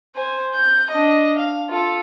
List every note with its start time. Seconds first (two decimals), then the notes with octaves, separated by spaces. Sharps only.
0.16 C5 G#5
0.54 G6
0.91 D4 D#5
1.38 F5
1.70 F4 A4